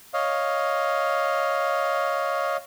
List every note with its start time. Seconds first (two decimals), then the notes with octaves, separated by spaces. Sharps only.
0.14 C#5 D#5 F5